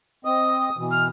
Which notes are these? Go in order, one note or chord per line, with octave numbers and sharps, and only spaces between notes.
C4 D#5 D#6
B2 E3
F6